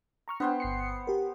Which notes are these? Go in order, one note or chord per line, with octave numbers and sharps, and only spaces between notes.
A#5 C#6 F6
B3 D4 C5 G5
G1 C7 C#7
G4 A#4